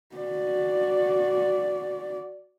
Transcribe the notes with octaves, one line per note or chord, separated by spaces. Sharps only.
F#4 D5